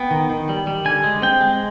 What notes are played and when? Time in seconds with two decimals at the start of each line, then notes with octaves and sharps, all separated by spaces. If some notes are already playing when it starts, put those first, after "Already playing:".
Already playing: B3 G5
0.11 D#3
0.30 D#3
0.49 G3
0.67 G3
0.85 D3 G#5
1.04 G#3
1.22 C4 G5
1.41 G#3